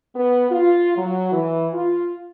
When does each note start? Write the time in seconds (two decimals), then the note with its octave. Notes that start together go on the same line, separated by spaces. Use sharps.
0.16 B3
0.51 F4
0.96 F#3
1.32 E3
1.73 F4